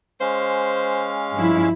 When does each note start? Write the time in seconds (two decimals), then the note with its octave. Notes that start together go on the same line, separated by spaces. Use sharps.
0.21 G#3 C#4 C5 F5
1.33 G2 F3 E4